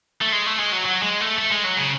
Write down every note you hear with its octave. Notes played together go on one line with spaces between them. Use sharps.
A3
G#3
A3
G#3
F#3
F#3
G#3
A3
A3
G#3
F#3
C#3